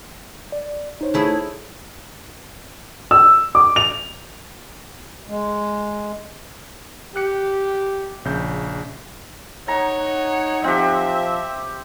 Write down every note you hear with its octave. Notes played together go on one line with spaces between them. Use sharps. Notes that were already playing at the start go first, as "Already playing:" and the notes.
D5
D#4 C5 C#5
A3 E4 G#4
E6
D6
F7
G#3
G4 F#6 C#7
A#1 C#3 G6
D#4 C#5 F#5 A#5
F3 C4 G4 E5